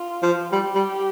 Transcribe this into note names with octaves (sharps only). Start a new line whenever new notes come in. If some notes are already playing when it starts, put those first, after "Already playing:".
Already playing: F4
F3
G3 G4
G3